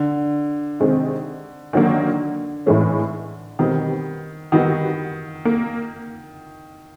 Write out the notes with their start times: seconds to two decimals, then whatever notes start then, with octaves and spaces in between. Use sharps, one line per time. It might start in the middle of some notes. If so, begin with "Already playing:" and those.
Already playing: D3
0.80 C3 D#3 G#3 C4
1.73 D3 D#3 F#3 A#3
2.66 A2 E3 G#3 C#4
3.59 B2 D#3 G3 C4 D#4
4.52 D#3 G3 B3 D#4 F#4
5.45 A#3